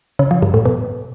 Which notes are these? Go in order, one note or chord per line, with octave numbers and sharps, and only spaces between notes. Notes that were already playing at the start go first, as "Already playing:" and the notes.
C#3
F3
G2
A2
B2